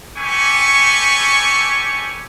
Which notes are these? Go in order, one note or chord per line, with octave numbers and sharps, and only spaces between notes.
C#4 G4 A4 B4 G#5 C#6